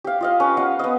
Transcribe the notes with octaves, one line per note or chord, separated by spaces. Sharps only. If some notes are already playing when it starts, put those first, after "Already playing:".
G4 F5
F4 D#5 F5
C#4 B4
D#5 F5 F#5
B3 D#5